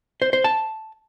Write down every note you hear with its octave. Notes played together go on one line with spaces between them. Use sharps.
C5
C5
A5